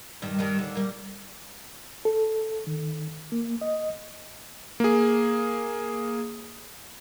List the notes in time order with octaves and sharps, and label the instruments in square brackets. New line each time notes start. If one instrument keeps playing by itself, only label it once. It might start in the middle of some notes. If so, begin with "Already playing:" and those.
[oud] G2 D#3 G3
G2 D#3 G3
D#2 D3
G3 A#3
[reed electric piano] A4
D#3
A#3
D#5
[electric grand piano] A#3 G#4